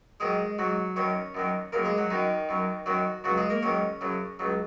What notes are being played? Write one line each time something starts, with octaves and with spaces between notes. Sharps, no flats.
G#2 D#3 F#3 G#3 G#4
G#2 F#3 F#4
F#2 D#3 F#3 C#4 C#5
F#2 D#3 F#3
D#2 C#3 F#3 A#3 A#4
G#3 G#4
F#3 F#4
F#2 D#3 F#3 D#4
F#2 F#3
F#2 D#3 F#3 F#4
C#2 C#3 F#3 F#4
G#3 G#4
A#3 A#4
G#2 D#3 F#3 C#4 C#5
F#2 C#3 F#3
C#2 C#3 F#3